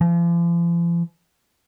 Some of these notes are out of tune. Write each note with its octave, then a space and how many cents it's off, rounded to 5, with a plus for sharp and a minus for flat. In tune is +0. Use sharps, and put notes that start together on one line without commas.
F3 -45